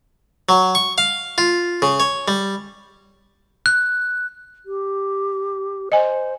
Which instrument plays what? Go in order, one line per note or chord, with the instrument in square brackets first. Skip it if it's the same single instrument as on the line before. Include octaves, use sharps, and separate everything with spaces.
[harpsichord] F#3
C#6
F5
F4
C#3
C#5
G3
[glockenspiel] F#6
[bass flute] G4
[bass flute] C5 [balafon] D#5 G#5